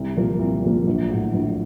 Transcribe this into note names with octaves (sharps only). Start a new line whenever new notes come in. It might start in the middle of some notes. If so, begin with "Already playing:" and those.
Already playing: C2
A#2 F3 A#3
C2
A#2 F3 A#3
A#1
A2 F#3
A#1